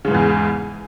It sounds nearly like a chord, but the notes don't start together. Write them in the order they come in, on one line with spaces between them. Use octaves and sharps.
C#3 G#2 E3 E2